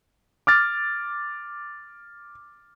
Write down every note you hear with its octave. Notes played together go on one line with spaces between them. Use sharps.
D6 F6 A6